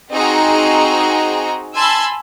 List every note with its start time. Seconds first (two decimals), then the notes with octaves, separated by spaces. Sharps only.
0.12 C4 D#4 F#4 G#4 A#5
1.77 G#5 A5 B5 C6 E6